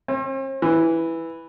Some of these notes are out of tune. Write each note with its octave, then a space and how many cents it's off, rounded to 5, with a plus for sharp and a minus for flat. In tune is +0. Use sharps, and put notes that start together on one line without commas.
C4 +45
E3 +0